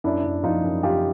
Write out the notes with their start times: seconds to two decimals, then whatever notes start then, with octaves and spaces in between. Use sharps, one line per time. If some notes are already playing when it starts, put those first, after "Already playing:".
0.04 F#2 D4 E4
0.24 F#2
0.43 F3 D#4 F4
0.64 F#2
0.83 F#2 F4 G4